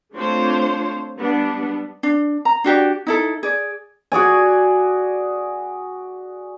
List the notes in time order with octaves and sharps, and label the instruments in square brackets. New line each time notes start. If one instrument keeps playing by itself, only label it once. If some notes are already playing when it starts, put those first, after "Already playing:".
[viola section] A3 C4 D4 F4 C5 C#5
G3 B3 D4
[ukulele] D4
A#5
D4 F#4 G4 D5
D#4 E4 A4
G#4 D5
[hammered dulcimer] F#4 G#4 D5 G#5